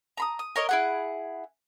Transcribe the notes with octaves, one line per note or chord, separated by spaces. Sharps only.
A#5 B5 D#6
D#6
A#4 C#5 D#5
E4 G#4 F#5